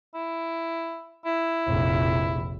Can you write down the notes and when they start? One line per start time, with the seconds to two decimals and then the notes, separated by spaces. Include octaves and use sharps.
0.15 E4
1.26 E4
1.66 F1 A#1